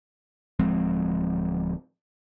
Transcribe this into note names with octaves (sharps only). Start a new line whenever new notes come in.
D1 F3 G#3 C4